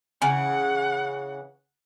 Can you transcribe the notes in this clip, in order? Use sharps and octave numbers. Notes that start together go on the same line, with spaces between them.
C#3 E3 F#5 G#5